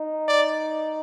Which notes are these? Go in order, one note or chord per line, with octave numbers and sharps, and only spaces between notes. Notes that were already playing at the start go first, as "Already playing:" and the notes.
Already playing: D#4
D5